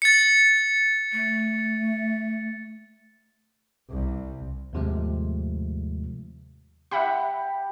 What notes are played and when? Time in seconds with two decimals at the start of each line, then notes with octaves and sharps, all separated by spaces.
0.02 A6 C#7
1.13 A3
3.90 C2
4.73 D#2 G#2 C3 F3 G#3 A3
6.91 G4 E5 F#5 B5